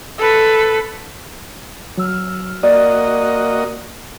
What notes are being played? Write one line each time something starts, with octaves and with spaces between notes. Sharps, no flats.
A4 B4
F#3 E6 F6
A#3 F#4 D5 D#5